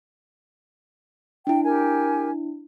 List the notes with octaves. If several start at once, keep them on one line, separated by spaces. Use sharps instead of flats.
D4 E4 G5
G4 A#4 G#5